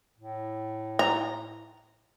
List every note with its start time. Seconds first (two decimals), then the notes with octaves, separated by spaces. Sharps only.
0.18 A2
0.99 A#5